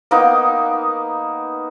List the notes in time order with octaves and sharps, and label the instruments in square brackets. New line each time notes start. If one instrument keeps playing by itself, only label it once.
[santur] A#3 B3 D#4